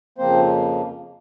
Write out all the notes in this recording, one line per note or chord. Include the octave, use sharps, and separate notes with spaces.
F2 C#3 F3 A#3 C4 C5